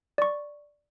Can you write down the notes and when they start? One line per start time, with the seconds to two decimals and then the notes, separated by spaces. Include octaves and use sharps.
0.18 D5 C#6